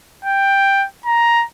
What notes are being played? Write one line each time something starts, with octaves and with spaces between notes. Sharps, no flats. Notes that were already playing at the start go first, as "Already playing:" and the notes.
G5
A#5